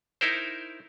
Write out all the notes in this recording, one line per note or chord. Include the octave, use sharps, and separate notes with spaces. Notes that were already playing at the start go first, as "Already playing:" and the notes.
D#4 E4 A#4 C5